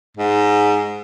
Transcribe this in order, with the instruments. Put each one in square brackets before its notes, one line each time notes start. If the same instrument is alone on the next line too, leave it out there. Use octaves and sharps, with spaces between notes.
[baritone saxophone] G#2